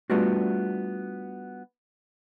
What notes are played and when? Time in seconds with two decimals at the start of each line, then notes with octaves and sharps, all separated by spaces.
0.10 G3 A3 B3 D4 F4 F#4